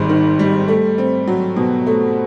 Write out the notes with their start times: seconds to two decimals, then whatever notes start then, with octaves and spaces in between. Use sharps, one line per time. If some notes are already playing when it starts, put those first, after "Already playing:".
Already playing: G#1 G#2 G3
0.09 D#3
0.39 G3
0.68 A3
0.98 C4
1.27 F#3
1.57 B2
1.86 A3